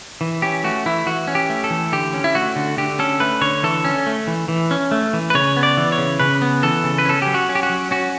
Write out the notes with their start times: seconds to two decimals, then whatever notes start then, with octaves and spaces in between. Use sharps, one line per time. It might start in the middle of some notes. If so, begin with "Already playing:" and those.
0.21 E3
0.42 C#4 G4
0.64 A3 F#4
0.86 E3 E4
1.06 E3 F#4
1.28 C#4
1.35 G4
1.50 A3
1.64 A4
1.70 E3
1.92 D3 G4
2.14 C#4
2.24 E4
2.35 A3 F#4
2.56 D3
2.78 D3 G4
2.99 C#4 A4
3.20 A3 B4
3.41 D3 C#5
3.63 E3 A4
3.84 C#4
4.06 A3
4.27 E3
4.48 E3
4.71 C#4
4.91 A3
5.13 E3
5.30 B4
5.35 C#3 C#5
5.57 B3
5.63 D5
5.77 E3
5.92 C#5
5.98 C#3
6.20 C#3 B4
6.42 B3
6.63 E3 A4
6.84 C#3
6.98 B4
7.05 C#4 A4
7.22 F#3 G4
7.34 F#4
7.49 C#4
7.55 G4
7.63 F#4
7.70 F#3
7.91 C#4 F#4